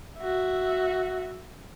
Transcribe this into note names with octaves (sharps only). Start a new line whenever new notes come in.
F#4 E5